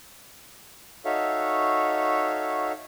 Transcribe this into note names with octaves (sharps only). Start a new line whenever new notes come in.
D#4 F#4 A4 C#5 E5 F5